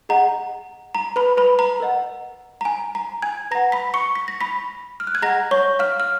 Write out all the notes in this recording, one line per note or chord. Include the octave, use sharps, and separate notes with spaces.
G#4 D#5 F#5 A#5
A#5
B4 B5
B4 B5
A#5
A#4 D#5 F#5
A#5
G#5
A#5
G#5 G#6
B4 F#5 A#5 A#6
B5 B6
C#6 C#7
B6
A#6
B5 B6
F6
F#6
G#6
G#4 D#5 F#5 A#5 A#6
C#5 C#6
F5 F6
F6